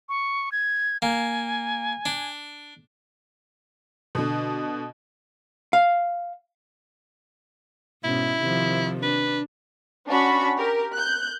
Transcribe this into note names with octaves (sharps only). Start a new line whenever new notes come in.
C#6
G#6
A#3 G#5
D4
B2 D3
F5
G#2 B2 C#4 E4
C3 D#3 F3
D4 B4
C#4 D4 F#4 A5 B5 C#6
G4 A#4
F#6 G6